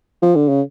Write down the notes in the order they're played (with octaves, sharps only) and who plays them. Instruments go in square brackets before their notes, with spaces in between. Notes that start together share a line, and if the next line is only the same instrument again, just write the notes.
[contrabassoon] F3
D3
C#3